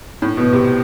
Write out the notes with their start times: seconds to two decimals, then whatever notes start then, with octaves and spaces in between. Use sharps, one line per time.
0.22 A2
0.37 B2
0.53 C3